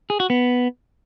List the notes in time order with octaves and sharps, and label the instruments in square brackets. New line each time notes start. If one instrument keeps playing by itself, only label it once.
[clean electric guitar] G#4
F#4
B3